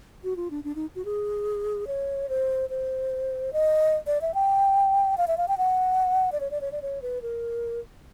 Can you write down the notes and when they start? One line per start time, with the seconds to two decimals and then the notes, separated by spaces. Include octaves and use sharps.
0.24 F#4
0.36 F4
0.51 D4
0.64 D4
0.75 D#4
0.95 F#4
1.05 G#4
1.87 C#5
2.29 C5
2.70 C5
3.53 D#5
4.07 D5
4.22 E5
4.34 G5
5.18 F5
5.28 E5
5.37 F5
5.48 G5
5.58 F#5
6.32 D5
6.40 C#5
6.51 D5
6.61 C#5
6.72 D5
6.82 C#5
7.02 B4
7.22 A#4